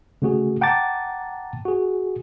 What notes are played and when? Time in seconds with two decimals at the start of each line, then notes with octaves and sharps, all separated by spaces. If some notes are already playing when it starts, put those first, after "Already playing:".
0.22 C#3 A3 F#4 G#4
0.61 F#5 G5 A5 A#5 D6 A6
1.65 F#4 G#4